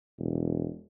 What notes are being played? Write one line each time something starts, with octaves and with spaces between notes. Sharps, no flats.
E1